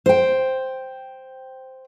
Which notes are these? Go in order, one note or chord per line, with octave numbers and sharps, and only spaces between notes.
C5 G5